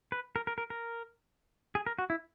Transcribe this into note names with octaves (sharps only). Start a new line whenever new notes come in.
B4
A#4
A#4
A#4
A#4
G#4
A#4
F#4
E4